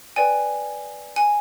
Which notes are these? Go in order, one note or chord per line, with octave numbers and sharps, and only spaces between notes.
B4 D5 G5 G#5
G#5